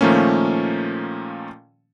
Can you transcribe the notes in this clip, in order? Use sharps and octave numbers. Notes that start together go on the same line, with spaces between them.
A#2 D#3 F3 A3 A#3 C#4